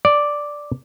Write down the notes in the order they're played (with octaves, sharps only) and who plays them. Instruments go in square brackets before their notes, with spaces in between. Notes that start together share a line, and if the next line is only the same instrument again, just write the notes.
[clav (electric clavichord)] D5